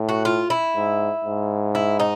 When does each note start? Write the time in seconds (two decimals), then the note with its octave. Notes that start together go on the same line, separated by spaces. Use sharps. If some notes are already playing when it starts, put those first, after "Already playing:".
Already playing: A2
0.09 F#4
0.25 F4
0.50 E4
0.76 G#2
1.24 G#2
1.75 E4
2.00 D#4